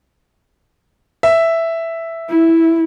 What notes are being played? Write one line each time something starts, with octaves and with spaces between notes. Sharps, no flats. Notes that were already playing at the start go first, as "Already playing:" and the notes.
E5
E4